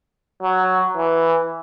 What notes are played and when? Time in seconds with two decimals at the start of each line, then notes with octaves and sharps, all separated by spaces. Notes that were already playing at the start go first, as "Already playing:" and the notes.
0.43 F#3
0.97 E3